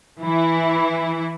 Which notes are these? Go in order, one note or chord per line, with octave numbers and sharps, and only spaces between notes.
E3 E4